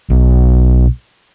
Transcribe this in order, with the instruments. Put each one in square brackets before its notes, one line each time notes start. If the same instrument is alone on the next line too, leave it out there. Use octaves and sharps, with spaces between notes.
[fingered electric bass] B1